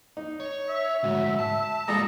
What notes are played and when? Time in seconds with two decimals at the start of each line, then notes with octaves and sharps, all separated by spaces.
0.17 D#4
0.40 C#5
0.69 E5
1.03 D2 G#2 F#4
1.39 A5
1.88 G3 G#3 F4 A4 D5 A#5 D#6